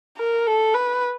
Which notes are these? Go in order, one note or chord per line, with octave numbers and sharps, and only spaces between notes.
A#4
A4
B4